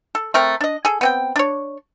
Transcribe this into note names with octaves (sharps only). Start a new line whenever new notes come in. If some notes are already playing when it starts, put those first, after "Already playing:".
A4
A3 C4 A#4
D4 D#5
G#4 A4
B3 C4 G5
D4 C#5